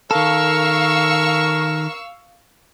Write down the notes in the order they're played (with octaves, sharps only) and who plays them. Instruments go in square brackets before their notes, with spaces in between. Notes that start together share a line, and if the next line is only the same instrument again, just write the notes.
[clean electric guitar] D#3 A4 [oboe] A#4 [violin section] F5 C#6 E6